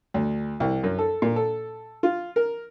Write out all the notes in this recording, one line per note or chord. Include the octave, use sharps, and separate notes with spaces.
D2
C2
F#2
A4
A#2
A4
F4
A#4